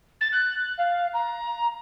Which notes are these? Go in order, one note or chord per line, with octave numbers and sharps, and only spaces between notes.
A6
F#6
F5
A#5